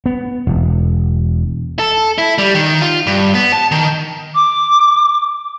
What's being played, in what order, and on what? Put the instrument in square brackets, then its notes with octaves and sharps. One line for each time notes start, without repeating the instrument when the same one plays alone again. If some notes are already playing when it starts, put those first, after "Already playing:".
[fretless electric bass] B3
E1
[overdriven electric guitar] A4
E4
G3
D#3
F4
G2
B3
A5
D#3
[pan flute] D6